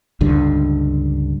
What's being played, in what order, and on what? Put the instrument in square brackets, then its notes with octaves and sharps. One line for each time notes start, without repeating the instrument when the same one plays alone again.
[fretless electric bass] C#2 G2 D3